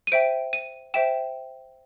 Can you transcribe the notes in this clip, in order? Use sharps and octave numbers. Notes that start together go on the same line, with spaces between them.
D#7
C5 E5 G5 D7
D#7
C5 E5 G5 E7